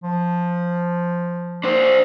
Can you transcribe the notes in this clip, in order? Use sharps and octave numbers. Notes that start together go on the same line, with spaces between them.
F3
D4 C5